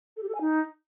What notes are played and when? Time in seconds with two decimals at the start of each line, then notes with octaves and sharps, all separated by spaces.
0.16 A4
0.22 G4
0.28 A4
0.34 G#5
0.40 D#4